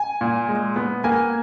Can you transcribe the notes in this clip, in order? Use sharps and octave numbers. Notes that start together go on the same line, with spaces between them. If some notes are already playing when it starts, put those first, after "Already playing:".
Already playing: G#5
A#2
G#3
B3
A#3 G#5